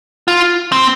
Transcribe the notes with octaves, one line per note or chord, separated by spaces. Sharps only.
F4
C4